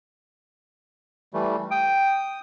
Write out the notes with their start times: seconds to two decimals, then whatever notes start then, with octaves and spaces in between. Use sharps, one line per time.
1.34 E3 G3 A3
1.71 G5 D#6